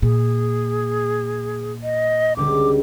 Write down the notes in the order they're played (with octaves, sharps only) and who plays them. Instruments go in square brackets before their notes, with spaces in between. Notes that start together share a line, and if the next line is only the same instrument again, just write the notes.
[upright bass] A#2 [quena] G#4
[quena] D#5
[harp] C#2 D3 G3 [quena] D6